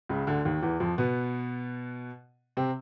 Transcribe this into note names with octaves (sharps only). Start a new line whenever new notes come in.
C#2 C#3
D2 D3
D#2 D#3
E2 E3
F2 F3
B2 B3
C3 C4